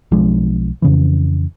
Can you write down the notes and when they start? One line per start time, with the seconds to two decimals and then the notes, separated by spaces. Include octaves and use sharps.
0.12 B1 F3 G#3 D4
0.82 F2 C#3 E3